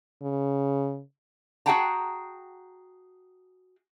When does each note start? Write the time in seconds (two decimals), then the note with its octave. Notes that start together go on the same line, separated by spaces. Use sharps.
0.23 C#3
1.66 F#4 G#4 F#5 G5 A5 A#5